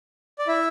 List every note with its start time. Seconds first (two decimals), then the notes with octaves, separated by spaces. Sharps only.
0.39 D5
0.48 E4 E5